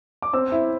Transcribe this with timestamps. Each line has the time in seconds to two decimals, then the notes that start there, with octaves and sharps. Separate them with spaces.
0.22 D6
0.33 C4 E6
0.52 E4